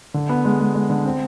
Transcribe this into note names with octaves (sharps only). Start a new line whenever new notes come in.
D3
B3
G#3
G#3
G#3
D3
C4